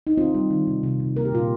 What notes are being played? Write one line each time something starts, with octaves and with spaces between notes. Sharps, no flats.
D#4
D#3 C4 F4
G3
D#3
C3
C3
C3
A#3 A#4
G4
A#2 F4